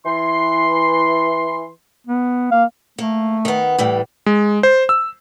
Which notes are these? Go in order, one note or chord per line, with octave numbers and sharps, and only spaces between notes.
E3 C6
B3
A#3 F5
A3 A#3
D#3 B3
A2 E3 G3
G#3
C5
E6